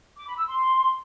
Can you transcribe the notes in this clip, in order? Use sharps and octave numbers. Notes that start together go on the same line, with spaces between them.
D6
B5
E6
C6